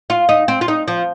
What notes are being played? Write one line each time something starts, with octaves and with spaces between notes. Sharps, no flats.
F4
D#4
C4
F4
D#4
F3